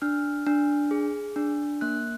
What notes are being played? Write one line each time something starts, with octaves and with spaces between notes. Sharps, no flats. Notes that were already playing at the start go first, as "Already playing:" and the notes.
D4 F6
D4
G#4
D4
A#3 F#6